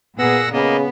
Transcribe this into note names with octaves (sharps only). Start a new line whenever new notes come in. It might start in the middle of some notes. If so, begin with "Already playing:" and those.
A#2 B3 G#4 A#4 F#5 E6 A#6
C#3 A#3 B3 D#5